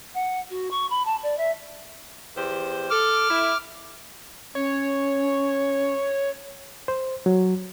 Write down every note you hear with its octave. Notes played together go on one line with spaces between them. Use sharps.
F#5
F#4
C#6
B5
A5
D5
E5
E2 G4 C5
A4 D6 F6
E4
C#4 C#5
C5
F#3